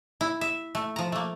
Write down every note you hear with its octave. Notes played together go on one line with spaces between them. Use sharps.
E4
E5
A3
F3 A#5
A3 A#3